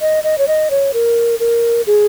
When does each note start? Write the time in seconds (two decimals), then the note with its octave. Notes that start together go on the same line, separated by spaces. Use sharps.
0.01 D#5
0.24 D#5
0.38 C#5
0.48 D#5
0.70 C#5
0.94 A#4
1.40 A#4
1.87 G#4